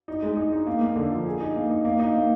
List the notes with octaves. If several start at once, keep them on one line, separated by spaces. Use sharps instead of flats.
D#4
G#3
D#4
D#4
A#3
A#3
D3
F3
G#4
D#4
A#3
D#4
A#3
D#4
A#3